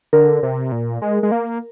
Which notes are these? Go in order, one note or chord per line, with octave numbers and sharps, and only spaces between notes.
D3 A#4
C3
A#2
G#3
G#3
A#3